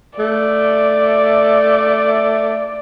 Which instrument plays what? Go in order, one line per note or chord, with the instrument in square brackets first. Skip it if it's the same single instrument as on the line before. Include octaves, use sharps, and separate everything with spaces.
[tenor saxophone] A3 [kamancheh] D5